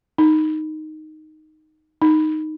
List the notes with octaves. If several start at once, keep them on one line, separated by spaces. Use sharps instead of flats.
D#4
D#4